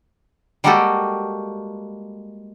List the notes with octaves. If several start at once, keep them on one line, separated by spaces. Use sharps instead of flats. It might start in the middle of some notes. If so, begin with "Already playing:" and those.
G3 G#3 A#3 F#4 G4 A4